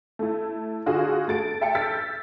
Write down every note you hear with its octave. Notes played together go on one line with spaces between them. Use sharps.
A3 E4
D3 F4 F#4 G#4
A3 A6 D7
E5 G5 A5 C#7 D7
E6 F6 G6 A6 B6